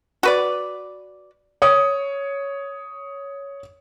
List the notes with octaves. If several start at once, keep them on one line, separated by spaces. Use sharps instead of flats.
F#4 B4 D5
C#5 D#6